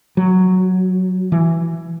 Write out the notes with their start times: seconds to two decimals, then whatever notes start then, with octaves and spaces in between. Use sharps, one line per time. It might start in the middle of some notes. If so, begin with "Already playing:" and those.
0.17 F#3
1.32 E3